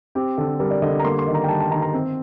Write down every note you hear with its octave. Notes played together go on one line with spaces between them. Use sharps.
C4 G4
D3 A4
G3 A#4
D5
D3 D#5
A#5
A#3 C6
C6
D#3
A#5
G5
G3 A5
A5
D#3 A#5
A#5
C4